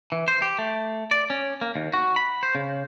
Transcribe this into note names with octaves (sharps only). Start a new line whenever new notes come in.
E3
C5
G4
A3
D5
C#4
A#3
D#2
F#4
B5
C5
C#3